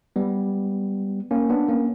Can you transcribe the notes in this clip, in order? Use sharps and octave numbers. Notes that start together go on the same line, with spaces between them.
G3 B3
A#3 C#4
B3 D4
A#3 C#4